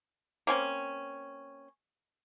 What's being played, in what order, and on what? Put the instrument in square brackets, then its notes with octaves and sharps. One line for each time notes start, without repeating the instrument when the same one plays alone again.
[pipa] A#3 C4 C#4